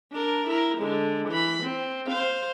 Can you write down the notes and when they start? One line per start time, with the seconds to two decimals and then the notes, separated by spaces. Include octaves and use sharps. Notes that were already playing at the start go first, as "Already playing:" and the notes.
0.12 D4 A#4
0.47 E4 A#4
0.78 D3 G#3
1.28 E3 B5
1.63 C4
2.07 C5 F5